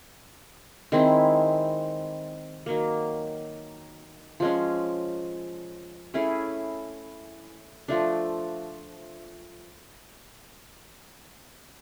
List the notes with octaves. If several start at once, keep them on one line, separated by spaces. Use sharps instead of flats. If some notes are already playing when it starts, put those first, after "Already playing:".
D#3 G#3 C4 E4
D#3 F#3 A#3
F3 G#3 C#4
A3 C#4 E4 G#4
F3 A3 D4